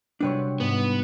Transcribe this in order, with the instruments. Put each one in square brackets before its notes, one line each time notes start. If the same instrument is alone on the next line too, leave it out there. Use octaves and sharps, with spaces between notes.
[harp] C3 G3 F#4 [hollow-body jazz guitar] D4 B4 C#5
[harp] G#2 [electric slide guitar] B3